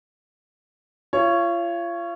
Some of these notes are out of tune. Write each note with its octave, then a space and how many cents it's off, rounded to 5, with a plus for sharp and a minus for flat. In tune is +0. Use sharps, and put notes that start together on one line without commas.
F4 -35 C#5 +0